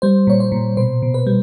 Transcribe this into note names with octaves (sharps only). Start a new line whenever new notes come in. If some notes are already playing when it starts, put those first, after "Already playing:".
G3 C5
A#2 C#5
C5
A#2
B2 C5
B2
B4
G3